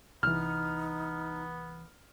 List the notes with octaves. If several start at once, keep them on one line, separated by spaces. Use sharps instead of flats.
C2 E3 B3 D#4 F6